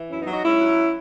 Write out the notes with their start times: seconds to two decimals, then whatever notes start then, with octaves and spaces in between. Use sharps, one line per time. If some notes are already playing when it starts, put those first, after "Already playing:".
Already playing: E3
0.10 F#2 C#4 E4
0.21 B3 D#4
0.27 F#3
0.32 D#4 F#4
0.44 G#2 C#4 E4
0.61 F#3